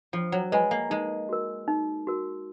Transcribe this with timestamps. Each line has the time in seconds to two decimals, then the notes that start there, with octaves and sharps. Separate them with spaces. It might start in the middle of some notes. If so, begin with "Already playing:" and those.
0.13 F3 F4
0.32 F#3
0.52 G#3 B4 D#5 G#5 B5
0.71 A#3
0.90 G#3 D#4
1.29 F#4 A#4
1.68 D#4
2.07 F#4 A#4